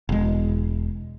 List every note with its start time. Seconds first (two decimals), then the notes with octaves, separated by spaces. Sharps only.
0.09 E1 G#3